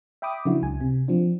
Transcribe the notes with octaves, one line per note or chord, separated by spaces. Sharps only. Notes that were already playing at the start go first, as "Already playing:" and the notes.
E5 G5 B5 D6 D#6
C#3 F3 F#3 D4 E4 F#4
C#2 G#5
C3
F3 C4 D4